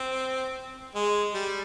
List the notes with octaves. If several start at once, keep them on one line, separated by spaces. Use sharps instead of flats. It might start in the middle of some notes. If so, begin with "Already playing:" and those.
Already playing: C4
G#3
G3